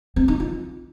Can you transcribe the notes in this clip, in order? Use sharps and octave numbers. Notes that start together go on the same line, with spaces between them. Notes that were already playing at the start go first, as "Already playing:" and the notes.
C4
D#4
F4